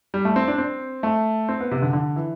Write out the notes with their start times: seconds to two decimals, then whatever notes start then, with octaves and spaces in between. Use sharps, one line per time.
0.14 G3
0.25 A3
0.36 C4
0.48 D4
0.58 C4
1.03 A3
1.49 C4
1.60 B3
1.71 C3
1.82 D3
1.93 D3
2.16 E3